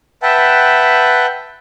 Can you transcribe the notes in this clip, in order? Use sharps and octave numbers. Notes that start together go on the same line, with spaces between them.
B4 E5 F#5 G5 A5